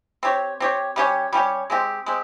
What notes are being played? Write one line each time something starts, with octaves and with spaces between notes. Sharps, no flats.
C4 G4 C#5
C4 G4 C#5
G3 C#4 G4 C#5
G3 C#4 G4 C#5
G#3 C4 G4
G#3 C4 G4